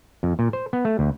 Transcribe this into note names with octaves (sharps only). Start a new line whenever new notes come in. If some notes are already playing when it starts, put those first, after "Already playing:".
F2
A#2
C5
B3
A3
D2